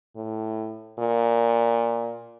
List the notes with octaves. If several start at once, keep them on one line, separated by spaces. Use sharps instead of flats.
A2
A#2